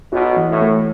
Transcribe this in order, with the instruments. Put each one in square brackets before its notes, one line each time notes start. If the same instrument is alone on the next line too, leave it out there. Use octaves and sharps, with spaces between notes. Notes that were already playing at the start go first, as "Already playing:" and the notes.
[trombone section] B1 B2 [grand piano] F#4
[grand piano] E3
[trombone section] A2
[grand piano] A3